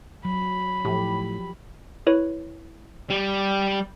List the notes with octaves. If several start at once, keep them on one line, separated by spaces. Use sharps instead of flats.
F#3 B5
A2 F3 G4
E4 B4 C#5
G3